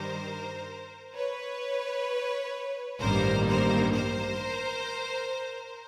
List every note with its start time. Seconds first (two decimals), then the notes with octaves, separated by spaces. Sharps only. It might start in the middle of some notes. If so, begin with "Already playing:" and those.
Already playing: G2 D#3 G3 A#4 C5
1.14 B4 C#5
3.00 A1 G2 D#3 G3 A#3 A#4 C5
3.47 A#4 C5
3.94 A#4 C5